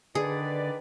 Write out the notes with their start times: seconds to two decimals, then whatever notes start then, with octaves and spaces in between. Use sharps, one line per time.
0.15 D3 D#3 G#4 B4 D5